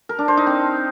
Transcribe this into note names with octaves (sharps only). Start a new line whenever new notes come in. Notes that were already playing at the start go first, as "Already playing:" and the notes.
A#4
D4
C5
D#4
C4